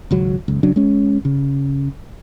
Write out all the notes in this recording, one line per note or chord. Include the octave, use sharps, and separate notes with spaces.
G#1 C#2 F#3
F#1 C#2
C#3 F#3 D4
G#3 C#4
C#3